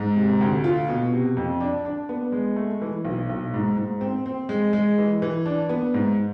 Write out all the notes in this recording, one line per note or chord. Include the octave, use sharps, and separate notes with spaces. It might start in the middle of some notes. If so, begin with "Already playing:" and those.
Already playing: G#2
C3
D2
F4
B2
C3
F2
D4
D4
B3
G#3
A3
E3
B1
B1
G#2
G#2
C4
C4
G#3
G#3
E3
E3
D4
B3
G#2